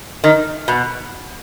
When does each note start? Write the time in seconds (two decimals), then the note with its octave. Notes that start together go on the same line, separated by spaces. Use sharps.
0.24 D#3
0.68 B2